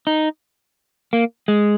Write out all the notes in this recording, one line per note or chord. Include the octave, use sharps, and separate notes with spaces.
D#4
A#3
G#3